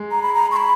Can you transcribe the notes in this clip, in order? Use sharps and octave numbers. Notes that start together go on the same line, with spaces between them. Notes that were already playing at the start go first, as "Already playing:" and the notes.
Already playing: G#3
A#5
B5
A#5
C#6
B5